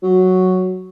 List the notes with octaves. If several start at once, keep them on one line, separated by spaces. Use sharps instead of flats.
F#3